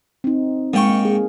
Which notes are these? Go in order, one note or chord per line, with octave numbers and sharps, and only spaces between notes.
C4 D#4
G#2 A#3 F5 G5 C#6
A#3
G#4